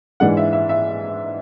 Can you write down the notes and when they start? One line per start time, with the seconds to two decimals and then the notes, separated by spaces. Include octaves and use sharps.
0.20 G#2 E3 G#3 D4 F#5
0.37 E5
0.53 E5
0.69 E5